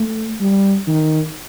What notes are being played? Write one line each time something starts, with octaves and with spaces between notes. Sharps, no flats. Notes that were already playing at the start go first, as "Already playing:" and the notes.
Already playing: A3
G3
D#3